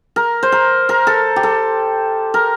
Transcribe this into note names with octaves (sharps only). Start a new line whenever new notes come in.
A#4
C5
A#4
A#4
A4
G4
A4
A#4